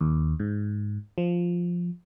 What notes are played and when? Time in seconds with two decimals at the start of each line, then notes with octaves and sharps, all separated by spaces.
0.01 D#2
0.40 G#2
1.18 F3